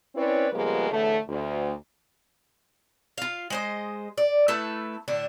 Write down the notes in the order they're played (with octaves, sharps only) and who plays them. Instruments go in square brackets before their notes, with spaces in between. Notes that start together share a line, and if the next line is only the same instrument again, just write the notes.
[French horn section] C4 C#4 E4 B4 C#5 D5
C#3 F3 G3 G#3 A#3 B3
E2 A2 D3 A3
D2
[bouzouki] F4 F5
G#3 C5 D#5
D5
A3 E4 A4 B4
A2 D3 D4